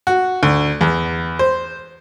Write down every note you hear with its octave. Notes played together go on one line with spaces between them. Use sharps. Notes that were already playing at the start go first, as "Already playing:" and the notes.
F#4
D2
E2
C5